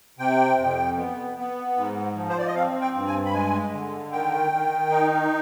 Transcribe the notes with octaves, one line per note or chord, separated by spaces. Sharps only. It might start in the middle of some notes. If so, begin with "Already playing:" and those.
C3 G5
F2
B3
B3
G#2
F3
C5
D5
D#5
C4 F5
G5
G2
G#5
B5
G#3 G#5
D3
D#3 G5
D#3
D#4